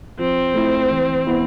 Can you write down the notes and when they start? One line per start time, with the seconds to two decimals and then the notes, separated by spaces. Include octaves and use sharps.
0.19 F3 C4
0.54 A3 E4
0.91 E3
1.26 B3 E4